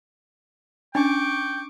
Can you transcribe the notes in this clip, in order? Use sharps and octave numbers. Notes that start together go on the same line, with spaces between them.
C#4 D4 G5 C#6 D6